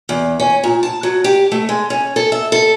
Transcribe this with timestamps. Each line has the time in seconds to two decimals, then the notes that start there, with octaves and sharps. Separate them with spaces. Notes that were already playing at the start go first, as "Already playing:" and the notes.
0.09 E2
0.40 C#4
0.64 A#2
0.83 A5
1.03 F#3
1.24 G4
1.52 A3
1.69 G#3
1.90 C#4
2.16 A4
2.32 E5
2.52 A4